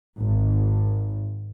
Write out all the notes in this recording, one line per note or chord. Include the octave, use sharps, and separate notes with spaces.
G#1